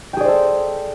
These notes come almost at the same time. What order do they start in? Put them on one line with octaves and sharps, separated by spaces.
G5 G#4 D5 C5 A4